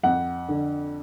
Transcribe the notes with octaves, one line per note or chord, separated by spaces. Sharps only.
F2 F#5
D3